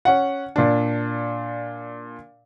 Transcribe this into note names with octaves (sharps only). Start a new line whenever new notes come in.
C#4 F#5
A#2 D4